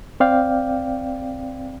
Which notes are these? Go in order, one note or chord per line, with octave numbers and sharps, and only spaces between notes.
C4 D5 F5 G5